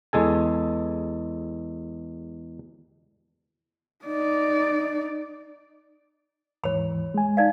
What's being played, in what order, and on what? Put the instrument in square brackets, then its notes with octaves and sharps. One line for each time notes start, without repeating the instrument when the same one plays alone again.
[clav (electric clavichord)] E2 G#3 A4 G#5
[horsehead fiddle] D#4 D5
[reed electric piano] D#2 G#2 E3 [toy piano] C#5 B5
[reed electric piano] G#3 G#5
[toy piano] D#4 D5 F5